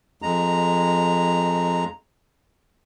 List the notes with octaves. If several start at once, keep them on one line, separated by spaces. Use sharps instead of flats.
F2 G#3 A#5